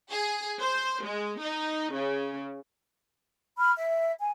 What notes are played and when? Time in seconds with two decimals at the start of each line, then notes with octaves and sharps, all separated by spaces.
0.12 G#4
0.60 C5
1.04 G#3
1.40 D#4
1.93 C#3
3.59 B5 F6
3.76 E5
4.19 G#5